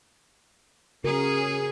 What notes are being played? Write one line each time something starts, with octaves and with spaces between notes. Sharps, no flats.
C#3 C#4 F#4 G#4 A#4